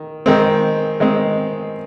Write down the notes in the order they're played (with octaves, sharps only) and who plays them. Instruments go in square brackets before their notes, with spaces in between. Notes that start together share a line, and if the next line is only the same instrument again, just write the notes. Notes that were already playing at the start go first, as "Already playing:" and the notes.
Already playing: [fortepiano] D#3
D#3 G#3 C4
D#3 G#3 C4